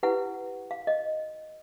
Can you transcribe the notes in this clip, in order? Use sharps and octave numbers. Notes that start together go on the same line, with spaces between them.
E4 G4 B4 F#5
F5
D#5